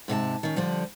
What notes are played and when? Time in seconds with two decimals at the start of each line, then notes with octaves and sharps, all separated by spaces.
0.08 G#2 C3 A4 A5
0.43 D#3 C#4
0.56 D3 F3 G3